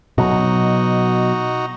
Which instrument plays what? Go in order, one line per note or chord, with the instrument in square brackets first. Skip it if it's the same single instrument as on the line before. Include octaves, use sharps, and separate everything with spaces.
[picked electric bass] B2 F#3 [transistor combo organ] D#4 F#4